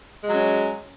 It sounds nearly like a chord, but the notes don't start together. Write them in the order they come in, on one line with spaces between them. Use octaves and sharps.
G#3 F#3 C#4